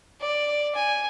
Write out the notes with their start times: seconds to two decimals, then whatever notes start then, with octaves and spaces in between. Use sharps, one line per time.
0.20 D5
0.75 G#5